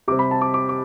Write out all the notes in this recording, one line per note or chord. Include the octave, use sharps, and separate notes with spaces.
C3 G3 C4 D6
B5
A5
D6
D6
D6